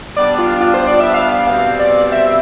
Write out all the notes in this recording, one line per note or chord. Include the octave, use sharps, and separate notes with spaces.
G3 B3 D4 D5
F4
F4
C5
D5
E5
F5
B2 G3 C4 F5
D5
E5